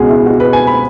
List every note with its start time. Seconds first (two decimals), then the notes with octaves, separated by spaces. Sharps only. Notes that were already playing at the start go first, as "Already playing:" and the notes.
Already playing: C#2 B2 G#3 F#4 G#4
0.09 E4
0.26 F#4
0.40 B4
0.53 G#5
0.67 B5